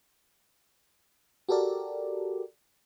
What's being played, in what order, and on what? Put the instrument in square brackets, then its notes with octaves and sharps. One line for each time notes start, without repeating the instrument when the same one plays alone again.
[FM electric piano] F#4 G4 A4 A#4 D5